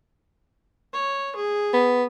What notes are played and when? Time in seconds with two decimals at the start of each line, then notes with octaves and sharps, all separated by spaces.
0.93 C#5
1.36 G#4
1.73 B3